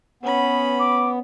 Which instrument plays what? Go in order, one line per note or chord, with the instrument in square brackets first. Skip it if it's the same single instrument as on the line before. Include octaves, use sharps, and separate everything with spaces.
[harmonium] B3 [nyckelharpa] C#4 B5
[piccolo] D6